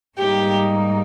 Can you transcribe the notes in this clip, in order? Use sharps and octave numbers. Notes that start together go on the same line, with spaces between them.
G#2 G3 A#3 D#4 G4